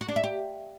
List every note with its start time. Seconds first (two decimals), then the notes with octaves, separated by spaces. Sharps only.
0.01 F#4
0.08 D4
0.16 E5
0.24 G4